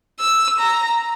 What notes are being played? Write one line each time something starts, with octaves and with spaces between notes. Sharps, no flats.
E6
A#5